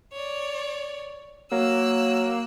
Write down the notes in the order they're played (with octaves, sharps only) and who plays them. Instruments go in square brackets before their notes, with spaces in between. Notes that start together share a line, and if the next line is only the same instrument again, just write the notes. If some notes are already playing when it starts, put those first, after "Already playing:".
[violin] C#5 D5
[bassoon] F#3 [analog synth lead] A#3 [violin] E6 F#6